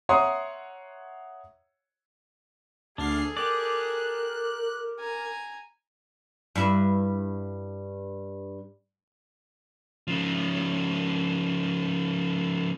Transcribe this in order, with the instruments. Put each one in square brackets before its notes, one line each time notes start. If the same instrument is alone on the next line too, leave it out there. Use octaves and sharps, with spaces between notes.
[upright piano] C#5 E5 F#5 A#5 C6 D#6
[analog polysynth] D2 F6 C7 [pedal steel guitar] D4 [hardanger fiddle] G#4 A4
[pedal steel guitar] G4 D5 [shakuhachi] A#4 [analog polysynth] F#6
[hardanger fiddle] G#5 A#5
[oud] G2 E4
[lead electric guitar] C#3 F3